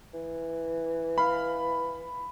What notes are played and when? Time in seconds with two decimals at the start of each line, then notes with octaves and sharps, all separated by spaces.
0.13 E3
1.18 F5 B5 F6